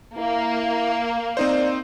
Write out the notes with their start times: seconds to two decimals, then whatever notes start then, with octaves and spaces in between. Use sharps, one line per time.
0.18 A#3 E4
1.37 C4 D#4 C5 D5